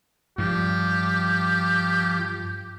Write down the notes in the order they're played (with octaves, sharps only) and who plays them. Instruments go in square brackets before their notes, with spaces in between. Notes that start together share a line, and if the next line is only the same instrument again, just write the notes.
[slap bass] G2 [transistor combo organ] F3 [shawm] G4